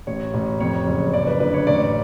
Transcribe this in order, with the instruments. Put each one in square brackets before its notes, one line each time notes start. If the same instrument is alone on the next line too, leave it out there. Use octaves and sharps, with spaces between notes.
[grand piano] A1 C#5
A1
F2 C#5
F#1
F#1 D5
B4
D3 B4
C#5
A1 D5